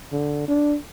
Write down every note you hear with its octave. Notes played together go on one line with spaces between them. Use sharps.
D3
D4